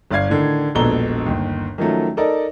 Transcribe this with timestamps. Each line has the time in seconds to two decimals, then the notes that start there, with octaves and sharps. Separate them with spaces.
0.11 G1 D5 F5 G#6 C7
0.30 A2 D3 D#3
0.75 E1 A#1 B2 A4 A#5 G7
1.26 G1 D#2
1.78 D#3 F3 F#3 A3 C#4
2.17 D#4 A4 A#4 D5 D#5